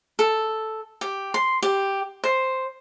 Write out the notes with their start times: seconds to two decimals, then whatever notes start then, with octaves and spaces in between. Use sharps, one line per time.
0.19 A4
1.01 G4
1.34 C6
1.62 G4
2.24 C5